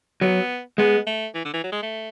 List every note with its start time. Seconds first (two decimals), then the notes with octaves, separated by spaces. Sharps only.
0.21 F#3 B3
0.78 G#3 B3
1.07 A3
1.35 E3
1.45 D3
1.54 E3
1.64 F#3
1.72 G#3
1.83 A3